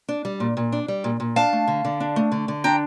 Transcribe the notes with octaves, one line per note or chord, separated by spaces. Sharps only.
D4
G3
A#2
A#2
D4
G3
A#2
A#2
D4 F5 A5
A3
D3
D3
D4
A3
D3
D3
D4 G5 A#5